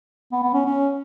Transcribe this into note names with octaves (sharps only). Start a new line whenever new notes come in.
B3
B3
C#4
C#4